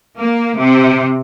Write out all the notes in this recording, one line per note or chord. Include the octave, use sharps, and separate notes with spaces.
A#3
C3